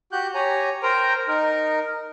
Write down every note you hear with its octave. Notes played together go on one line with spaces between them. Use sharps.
F#4 G4 F#6 G6
G4 C#5 G#5 A#5
A#4 C5 G5 A#5
D#4 A#4